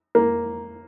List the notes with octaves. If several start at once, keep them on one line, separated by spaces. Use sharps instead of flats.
A#3